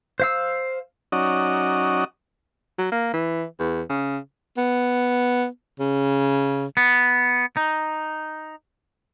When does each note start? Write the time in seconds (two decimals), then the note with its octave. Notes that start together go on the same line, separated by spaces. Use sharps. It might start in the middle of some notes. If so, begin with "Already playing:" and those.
0.20 C5 F5 E6
1.12 F#3 C#4 D#4 F#4 D5 D#5
2.78 F#3
2.91 A#3
3.13 E3
3.59 E2
3.90 C#3
4.57 B3
5.79 C#3
6.77 B3
7.57 D#4